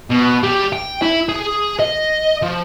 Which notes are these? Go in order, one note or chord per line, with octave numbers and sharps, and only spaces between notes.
B2
G3
G5
E4
G#4
D#5
F3